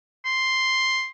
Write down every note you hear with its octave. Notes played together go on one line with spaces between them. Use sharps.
C6